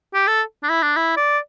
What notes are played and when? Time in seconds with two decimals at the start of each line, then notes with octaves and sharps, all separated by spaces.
0.14 G4
0.27 A4
0.63 D4
0.69 E4
0.82 D4
0.97 E4
1.17 D5